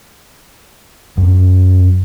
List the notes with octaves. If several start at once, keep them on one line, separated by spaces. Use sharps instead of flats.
F#2